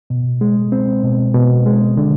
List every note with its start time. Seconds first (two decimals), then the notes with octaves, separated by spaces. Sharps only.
0.10 B2
0.41 G#3
0.72 C4
1.03 B2
1.35 B2
1.66 G#3
1.97 D3